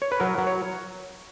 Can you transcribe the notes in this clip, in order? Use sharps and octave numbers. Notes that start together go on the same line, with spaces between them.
C#5
B4
F#3 A#4
F#3
C#5